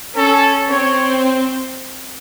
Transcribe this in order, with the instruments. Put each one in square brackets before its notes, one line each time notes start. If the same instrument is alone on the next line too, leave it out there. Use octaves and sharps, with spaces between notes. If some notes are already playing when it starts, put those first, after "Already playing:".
[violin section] C#4 [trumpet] A4
[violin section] C4 [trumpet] C#5